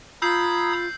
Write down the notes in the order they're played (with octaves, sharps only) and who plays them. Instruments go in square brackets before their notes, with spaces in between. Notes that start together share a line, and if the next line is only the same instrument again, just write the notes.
[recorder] F4 [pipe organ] A#5 D#6 G#6 [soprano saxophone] B5 [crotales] E6 G6 C7